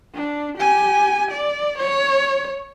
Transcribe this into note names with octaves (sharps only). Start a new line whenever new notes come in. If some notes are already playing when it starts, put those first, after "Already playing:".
D4
G4 G#5
D5
C#5